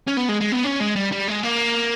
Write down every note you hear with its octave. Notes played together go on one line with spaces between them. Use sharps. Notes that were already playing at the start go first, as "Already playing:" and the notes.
C#4
B3
G#3
G#3
B3
C#4
G#3
G3
G3
G#3
A#3